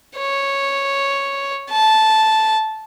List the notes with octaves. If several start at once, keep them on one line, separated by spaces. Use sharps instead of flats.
C#5
A5